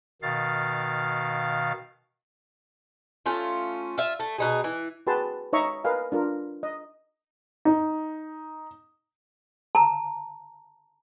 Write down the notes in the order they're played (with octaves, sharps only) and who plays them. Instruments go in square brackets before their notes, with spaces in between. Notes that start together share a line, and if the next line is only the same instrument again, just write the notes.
[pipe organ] B2 D#3 F5 A6
[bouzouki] A3 C#4 F4
F4 E5
A3
B2 D#4 G#4
E3
[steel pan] F#4 G#4 B4 G5 A5 C6
D#4 C#5 D#5 E5 A#5 C#6
A#4 B4 D#5 F5 G#5
D4 F4 A#4
D#5
[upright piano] D#4
[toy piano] A5 A#5